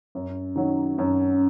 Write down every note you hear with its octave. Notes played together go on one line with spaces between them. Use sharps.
F#2
D#3 F#3
F#2